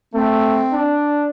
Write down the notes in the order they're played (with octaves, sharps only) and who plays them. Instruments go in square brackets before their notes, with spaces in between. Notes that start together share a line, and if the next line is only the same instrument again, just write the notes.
[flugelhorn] A3 [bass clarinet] C4
[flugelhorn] D4